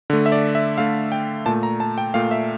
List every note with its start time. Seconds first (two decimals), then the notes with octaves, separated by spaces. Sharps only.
0.10 D3 A3
0.26 E5
0.32 D5
0.55 E5
0.78 D3 A3 F5
1.12 G5
1.46 A#2 A3 A5
1.63 A#5
1.80 A5
1.98 G5
2.14 A#2 A3 F5
2.31 E5